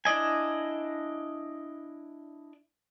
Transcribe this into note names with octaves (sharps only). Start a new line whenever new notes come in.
D4 E4 D5 D#5 G#5